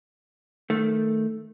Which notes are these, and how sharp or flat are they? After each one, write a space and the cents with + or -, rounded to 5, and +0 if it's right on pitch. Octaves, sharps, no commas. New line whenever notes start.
D#3 +0 A3 +0